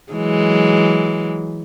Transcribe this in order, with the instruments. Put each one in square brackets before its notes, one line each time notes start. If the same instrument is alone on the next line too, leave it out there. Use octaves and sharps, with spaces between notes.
[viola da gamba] E3 F#3 G#3